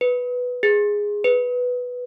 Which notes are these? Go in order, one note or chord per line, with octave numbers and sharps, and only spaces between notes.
B4
G#4
B4